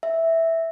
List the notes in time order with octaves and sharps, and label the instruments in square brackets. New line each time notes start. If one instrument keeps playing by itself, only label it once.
[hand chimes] E5